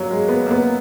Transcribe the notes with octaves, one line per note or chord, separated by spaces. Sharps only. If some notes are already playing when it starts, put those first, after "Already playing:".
Already playing: F#3 A#3
G#3
B3
A#3
B3